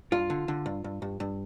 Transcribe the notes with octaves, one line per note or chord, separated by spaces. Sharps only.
G2 F4
D3
D3
G2
G2
G2
G2